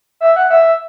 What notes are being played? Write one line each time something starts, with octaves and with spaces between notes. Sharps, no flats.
E5
F#5
E5